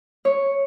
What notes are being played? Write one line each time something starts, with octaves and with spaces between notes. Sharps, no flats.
C#5